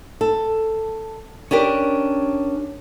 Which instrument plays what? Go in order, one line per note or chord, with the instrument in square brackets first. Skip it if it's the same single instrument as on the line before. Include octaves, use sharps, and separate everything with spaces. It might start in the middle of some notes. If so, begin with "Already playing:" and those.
[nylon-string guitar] A4
C#4 D4 G4 A#4